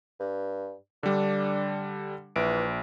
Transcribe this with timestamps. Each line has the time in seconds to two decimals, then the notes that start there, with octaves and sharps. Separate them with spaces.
0.20 G2
1.03 D3 G3 D4
2.36 A#1 E3 D7